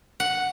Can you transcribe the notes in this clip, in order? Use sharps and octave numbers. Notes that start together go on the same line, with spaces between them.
F#5